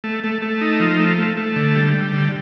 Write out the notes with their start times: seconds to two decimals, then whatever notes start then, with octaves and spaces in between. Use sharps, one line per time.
0.04 A3
0.24 A3
0.42 A3
0.61 D#4
0.80 F3
1.00 A3
1.18 A3
1.37 A3
1.56 D3
1.75 G3
1.94 G3
2.13 D3